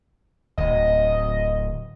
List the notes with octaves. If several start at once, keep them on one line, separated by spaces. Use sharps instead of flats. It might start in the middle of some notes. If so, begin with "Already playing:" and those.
D1 D#5